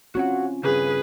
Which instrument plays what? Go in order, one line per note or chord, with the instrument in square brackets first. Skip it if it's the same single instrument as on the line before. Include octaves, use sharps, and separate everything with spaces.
[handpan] C4 C#4 F4 [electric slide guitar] F#4 C#5 F#5
[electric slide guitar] G2 C#3 [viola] G#4 B4